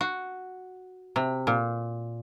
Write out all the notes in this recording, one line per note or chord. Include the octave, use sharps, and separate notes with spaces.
F#4
C3
A#2